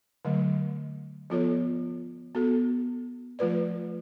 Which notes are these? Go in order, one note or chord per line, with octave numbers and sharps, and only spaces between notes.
D3 F#3 A3
F3 B3 F4 A4 C#5
B3 F#4 A4
F3 A3 F4 B4 D5